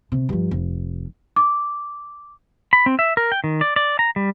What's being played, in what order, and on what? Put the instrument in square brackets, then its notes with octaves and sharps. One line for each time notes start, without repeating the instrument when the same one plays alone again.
[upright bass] C3
G2 F3
F1
[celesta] D6
[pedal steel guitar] B5
C4
E5
A#4
G5
D#3
D5
D5
A#5
G3